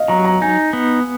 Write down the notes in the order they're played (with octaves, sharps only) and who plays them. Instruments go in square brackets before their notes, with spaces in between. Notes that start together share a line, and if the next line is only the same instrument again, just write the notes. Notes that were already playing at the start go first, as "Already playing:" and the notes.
Already playing: [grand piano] D#5 F5
[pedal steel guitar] F#3 [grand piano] A#5
[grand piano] A#5
[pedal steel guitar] D#4 [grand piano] G#5
[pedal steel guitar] B3